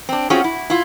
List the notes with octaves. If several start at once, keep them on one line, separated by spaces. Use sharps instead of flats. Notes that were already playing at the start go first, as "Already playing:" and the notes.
C4 D4
C4 C#4 F4 F#4 G#4
E4
E4 F4